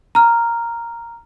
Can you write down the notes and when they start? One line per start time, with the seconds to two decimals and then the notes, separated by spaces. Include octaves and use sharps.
0.15 A#5 F6